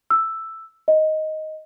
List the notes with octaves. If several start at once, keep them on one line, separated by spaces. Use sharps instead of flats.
E6
D#5